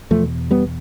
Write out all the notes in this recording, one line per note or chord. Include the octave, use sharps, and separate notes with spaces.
E2 B2 F3 A3
G3 B3